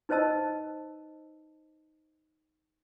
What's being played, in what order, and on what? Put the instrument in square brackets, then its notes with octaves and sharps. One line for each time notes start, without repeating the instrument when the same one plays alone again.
[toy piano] D#4 B4 C5 D#5 A5 E6